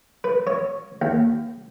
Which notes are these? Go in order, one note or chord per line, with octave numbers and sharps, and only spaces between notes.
B4
C#5
D#2